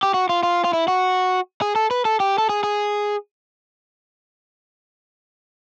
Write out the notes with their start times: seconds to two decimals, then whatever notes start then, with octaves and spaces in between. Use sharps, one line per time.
0.03 G4
0.14 F#4
0.29 F4
0.43 F4
0.64 F4
0.73 E4
0.88 F#4
1.62 G#4
1.76 A4
1.91 B4
2.05 A4
2.20 G4
2.38 A4
2.49 G#4
2.64 G#4